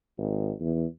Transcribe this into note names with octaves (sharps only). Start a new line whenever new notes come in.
G#1
E2